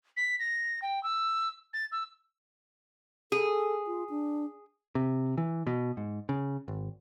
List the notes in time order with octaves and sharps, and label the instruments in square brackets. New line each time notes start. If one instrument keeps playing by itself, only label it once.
[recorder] B6
A#6
G5
E6
A6
E6
[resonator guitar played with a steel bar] G#4 [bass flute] A4
[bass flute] F4
D4
[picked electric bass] C3
E3
B2
G#2
C#3
G#1